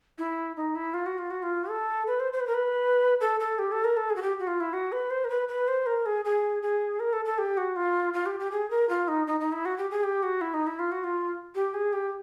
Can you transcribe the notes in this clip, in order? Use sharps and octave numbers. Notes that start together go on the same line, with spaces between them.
E4
D#4
E4
F4
F#4
F4
F#4
F4
A4
B4
C5
C5
B4
A#4
B4
A4
A4
G4
A4
A#4
A4
G#4
F#4
G4
F#4
F4
E4
F#4
B4
C5
A#4
B4
B4
C5
A#4
G#4
G#4
G#4
A#4
A4
A4
G4
F#4
F4
F4
G4
G4
G#4
A#4
F4
D#4
D#4
D#4
E4
F#4
G4
G#4
G4
F#4
E4
D#4
E4
F4
F#4
F4
G4
G#4
G4